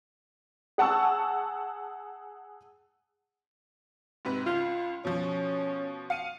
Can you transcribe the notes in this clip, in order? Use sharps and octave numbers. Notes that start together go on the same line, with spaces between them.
G#4 F#5 A5 C#6 E6
G#2 C3 B4
C#2 F4
B2 F3 C#4
F5 C#7 D#7